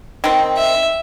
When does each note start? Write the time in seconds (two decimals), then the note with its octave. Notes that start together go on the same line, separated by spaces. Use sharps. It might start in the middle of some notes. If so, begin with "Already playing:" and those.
0.24 D#3 C4
0.57 E5